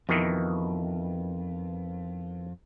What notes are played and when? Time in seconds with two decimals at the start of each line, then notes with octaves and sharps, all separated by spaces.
0.09 F2 B2 D#3 E3